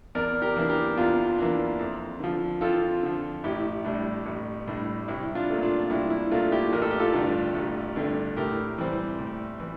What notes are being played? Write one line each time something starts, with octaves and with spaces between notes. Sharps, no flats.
E2 A#4 D5
G4 A#4
E3 A#3 D4
G4 A#4
E2 D4 F4
E3 A#3 D4
F2
D3 F3
F2 F4 A4
D3 F3
A1 E4 G4
A2 G3 D4
A1
A2 G3 D4
C2 E4
D4 F4
A#2 A3
D4 F4
D4
C2 E4
E4
A#2 A3 D4 F4
E4 G4
A1 A#4
A4
G4
F4 A4
G2 D3 A3
A1
G2 D3 A3
A2 G4 A#4
E3 G3 C4
A2
E3